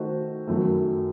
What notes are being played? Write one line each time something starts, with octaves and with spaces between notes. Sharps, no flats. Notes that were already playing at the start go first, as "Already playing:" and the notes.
Already playing: D#3 A3 D#4 F#4 C5
F#2 D#3 F#3 A3